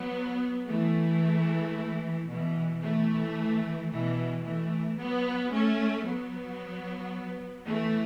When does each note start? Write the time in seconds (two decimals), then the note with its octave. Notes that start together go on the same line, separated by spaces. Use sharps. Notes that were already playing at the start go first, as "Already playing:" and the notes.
Already playing: F#3 B3
0.67 E3 A3
2.28 B2 E3
2.82 E3 A3
3.90 B2 E3
4.44 E3 A3
4.98 F#3 B3
5.52 A3 C#4
6.05 F#3 B3
7.67 E3 A3